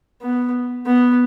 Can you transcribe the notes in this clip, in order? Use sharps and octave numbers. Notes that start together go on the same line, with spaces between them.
B3
B3